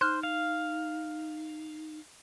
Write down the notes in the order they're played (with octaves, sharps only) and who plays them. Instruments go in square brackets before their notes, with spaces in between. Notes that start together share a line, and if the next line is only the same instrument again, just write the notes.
[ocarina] D#4 [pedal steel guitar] C5 [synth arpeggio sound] F6 F#6
[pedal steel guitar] F5